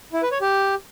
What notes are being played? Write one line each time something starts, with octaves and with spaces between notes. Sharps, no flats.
E4
B4
C#5
G4